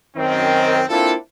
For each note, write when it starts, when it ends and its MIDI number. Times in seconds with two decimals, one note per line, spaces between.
0.16 0.83 42
0.16 0.83 51
0.16 0.83 60
0.89 1.14 58
0.89 1.14 60
0.89 1.14 62
0.89 1.14 64
0.89 1.14 65
0.89 1.14 69